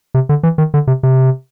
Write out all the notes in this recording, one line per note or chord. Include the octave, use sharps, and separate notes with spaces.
C3
D3
E3
D#3
D3
C3
C3